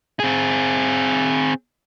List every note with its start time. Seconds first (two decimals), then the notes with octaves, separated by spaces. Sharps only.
0.20 C4 G#4